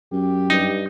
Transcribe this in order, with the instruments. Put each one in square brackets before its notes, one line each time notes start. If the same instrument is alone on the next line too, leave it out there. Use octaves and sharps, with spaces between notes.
[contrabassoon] F#2 [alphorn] G4
[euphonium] G2 [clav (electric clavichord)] D#4